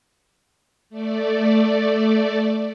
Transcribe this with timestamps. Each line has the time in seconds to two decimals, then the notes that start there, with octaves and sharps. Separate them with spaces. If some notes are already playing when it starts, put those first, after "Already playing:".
0.90 A3 D5